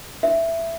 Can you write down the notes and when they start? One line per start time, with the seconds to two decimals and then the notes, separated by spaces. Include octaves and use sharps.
0.23 E5